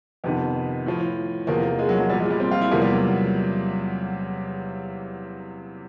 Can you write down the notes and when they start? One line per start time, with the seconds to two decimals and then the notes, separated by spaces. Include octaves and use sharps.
0.24 F2 C3 D#3 B3
0.86 A2 F3
1.47 E2 C3 F3 A#3
1.63 A#3
1.79 G#3
1.89 F#3
1.99 F#3
2.10 A#2 F3 G3
2.20 G#3
2.30 G3
2.40 C4
2.51 F4
2.61 E4
2.71 E2 C3 F3 A#3
2.82 G3
2.92 F#3